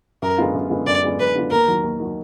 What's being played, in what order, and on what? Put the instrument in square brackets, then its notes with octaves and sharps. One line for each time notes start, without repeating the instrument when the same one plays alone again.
[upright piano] F#2 [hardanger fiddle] A#4
[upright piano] D3 G#3 B3 F4
F#2
D3 G#3 B3 F4
[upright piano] F#2 [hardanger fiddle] D5
[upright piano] D3 G#3 B3 F4
[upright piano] F#2 [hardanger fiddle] B4
[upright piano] D3 G#3 B3 F4
[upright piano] D#2 [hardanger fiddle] A#4
[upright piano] D#3 F#3
D#2
D#3 F#3